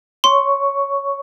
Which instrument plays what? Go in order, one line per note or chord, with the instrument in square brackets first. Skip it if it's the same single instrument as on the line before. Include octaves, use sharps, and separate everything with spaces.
[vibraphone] C#5 C#6 [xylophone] C6